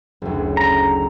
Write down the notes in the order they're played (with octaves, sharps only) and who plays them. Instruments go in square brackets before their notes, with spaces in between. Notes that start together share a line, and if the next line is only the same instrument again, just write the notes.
[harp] F#1 D2
[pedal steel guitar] A#5